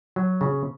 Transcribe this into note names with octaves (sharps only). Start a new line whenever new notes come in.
F#3
C#3